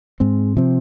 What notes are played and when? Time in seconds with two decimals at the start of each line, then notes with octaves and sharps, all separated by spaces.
0.20 G#2 G#3 C4
0.57 C3 F3 C4